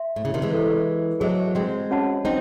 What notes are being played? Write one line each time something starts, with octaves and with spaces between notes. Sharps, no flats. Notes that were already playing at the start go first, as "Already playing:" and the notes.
Already playing: E5 C6
A2
C#3
C3 D#3
E3 G#3
E4 A4 C5
F#3 A3 G#4 C5 D#5
G#3 C4
C#4 F#4 C#5 F#5 A5
C4 D#4